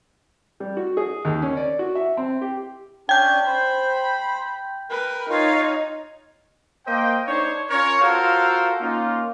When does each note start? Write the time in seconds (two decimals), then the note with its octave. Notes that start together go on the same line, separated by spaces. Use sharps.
0.60 G3
0.77 F#4
0.97 G#4
1.25 D#2
1.42 C#4
1.57 D5
1.79 F#4
1.95 E5
2.17 C4
2.41 G4
3.09 C#4 D4 G5 G6
3.46 C5 B5
4.91 A#4 B4
5.30 D#4 F4 C#5 F5
6.87 A#3 C5 D#5 G5
7.28 D4 D#4 C5 C#5
7.70 C#4 F4 A#4 C#5
8.02 F4 F#4 A4 A#4 C5 F5
8.81 A#3 C#4 D#4 F4